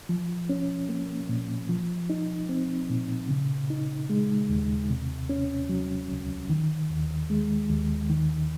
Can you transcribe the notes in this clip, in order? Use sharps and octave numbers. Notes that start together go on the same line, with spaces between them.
F3
C#4
A#3
A#2
F3
D#4
C4
A#2
C#3
D#4
G#3
D#2
C3
C#4
F#3
C#2
D#3
D#2
G#3
D#2
D#3